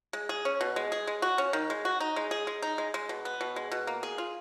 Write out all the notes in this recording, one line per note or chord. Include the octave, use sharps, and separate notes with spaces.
G#3
G#4
C#4
B2
G#3
G#4
G#3
F#4
C#4
D#3
G#3
F#4
D#4
G#3
G#4
G#3
D#4
G#3
G#3
B2
B3
B2
G#3
B2
A#3
G#4
F4